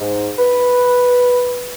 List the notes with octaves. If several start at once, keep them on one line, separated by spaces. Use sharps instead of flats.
G#2
B4